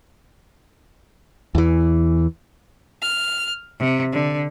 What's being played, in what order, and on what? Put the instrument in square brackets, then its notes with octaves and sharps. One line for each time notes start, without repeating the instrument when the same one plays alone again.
[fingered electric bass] E2 E3
[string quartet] F6
C3
D3